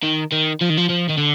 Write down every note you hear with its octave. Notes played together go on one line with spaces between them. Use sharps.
D#3
D#3
F3
D#3
F3
F3
D#3
D3